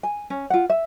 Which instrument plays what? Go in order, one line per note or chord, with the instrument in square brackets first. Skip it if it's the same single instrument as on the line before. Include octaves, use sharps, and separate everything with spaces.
[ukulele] G#5
C#4
F4 F#5
E5